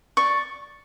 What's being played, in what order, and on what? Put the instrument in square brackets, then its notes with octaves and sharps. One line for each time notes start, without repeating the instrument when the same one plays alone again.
[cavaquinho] D5 C#6